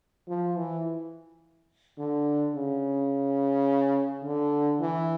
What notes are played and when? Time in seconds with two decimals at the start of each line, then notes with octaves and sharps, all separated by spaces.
0.28 F3
0.56 E3
1.98 D3
2.55 C#3
4.23 D3
4.80 E3